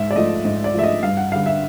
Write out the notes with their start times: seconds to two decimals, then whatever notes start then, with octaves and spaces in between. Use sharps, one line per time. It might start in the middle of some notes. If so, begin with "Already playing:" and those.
Already playing: G#2 E5
0.11 D5
0.16 F3 A3 D#5
0.45 G#2 D#5
0.64 D5
0.74 F3 A3 E5
0.83 D#5
1.03 G2 F5
1.17 F#5
1.32 D3 G3 F5
1.46 E5